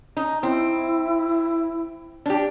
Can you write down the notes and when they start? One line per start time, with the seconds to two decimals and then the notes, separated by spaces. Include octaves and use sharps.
0.17 D#4
0.43 C4 E4
2.26 D4 G4